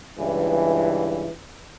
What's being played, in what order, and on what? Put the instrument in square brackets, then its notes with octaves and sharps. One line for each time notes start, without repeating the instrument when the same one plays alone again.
[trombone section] C#2 G2 E3